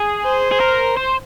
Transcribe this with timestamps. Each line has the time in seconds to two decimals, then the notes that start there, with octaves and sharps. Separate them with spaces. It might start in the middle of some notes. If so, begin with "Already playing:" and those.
Already playing: G#4
0.24 C5
0.52 G#4
0.60 A#4
0.97 C5